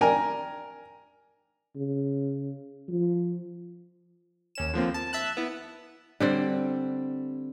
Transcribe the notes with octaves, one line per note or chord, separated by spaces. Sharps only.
A#4 D5 G5 G#5 A#5
C#3
F3
D#2 C#4 E7
D3 F3 A#3 C4
A5
E5 A5 F#6
B3 E4
D3 G3 C4